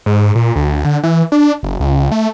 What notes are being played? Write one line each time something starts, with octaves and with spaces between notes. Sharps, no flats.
G#2
A#2
D2
D3
E3
D4
F#1
C#2
A3